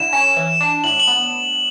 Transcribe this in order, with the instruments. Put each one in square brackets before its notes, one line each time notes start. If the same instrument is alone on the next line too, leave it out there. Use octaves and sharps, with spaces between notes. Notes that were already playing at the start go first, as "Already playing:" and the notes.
Already playing: [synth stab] D3 E4 [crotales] E7
[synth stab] C#4
E3
D4
[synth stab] A2 [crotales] F#7
[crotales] F#7
[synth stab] B3